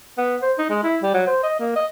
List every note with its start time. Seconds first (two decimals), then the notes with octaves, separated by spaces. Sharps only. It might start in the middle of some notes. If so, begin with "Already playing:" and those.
0.18 B3
0.42 C5
0.58 D#4
0.70 G#3
0.84 E4
1.03 G3
1.14 F#3
1.27 C5
1.43 D#5
1.59 A#3
1.76 D#5